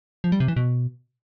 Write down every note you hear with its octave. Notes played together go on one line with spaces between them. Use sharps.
F3
G3
C3
E3
B2